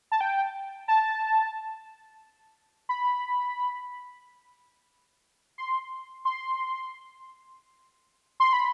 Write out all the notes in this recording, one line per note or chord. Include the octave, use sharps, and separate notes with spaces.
A5
G5
A5
B5
C6
C6
C6
B5